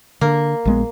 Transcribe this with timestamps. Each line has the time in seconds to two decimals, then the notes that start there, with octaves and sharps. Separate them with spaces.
0.21 D3 A#3
0.65 A#1 G#3 B3